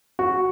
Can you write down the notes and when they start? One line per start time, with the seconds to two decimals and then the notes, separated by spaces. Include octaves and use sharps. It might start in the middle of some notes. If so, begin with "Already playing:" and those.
0.19 F#4